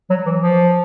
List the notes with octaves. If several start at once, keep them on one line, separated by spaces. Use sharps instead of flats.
F#3
E3
F3